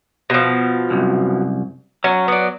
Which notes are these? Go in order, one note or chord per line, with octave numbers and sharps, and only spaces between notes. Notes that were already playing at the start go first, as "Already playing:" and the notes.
B2 F3
C2 F#2
F#3 C#4
B3 D5